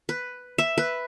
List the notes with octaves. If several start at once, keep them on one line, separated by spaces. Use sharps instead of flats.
B4
E5
B4